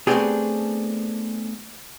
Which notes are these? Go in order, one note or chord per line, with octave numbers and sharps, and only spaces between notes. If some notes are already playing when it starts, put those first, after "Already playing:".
A3 B3 C4 D4 G4 G#4